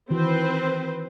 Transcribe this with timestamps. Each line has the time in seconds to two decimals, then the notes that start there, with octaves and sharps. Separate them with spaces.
0.11 D#3 E3 C4 F#4 B4 C5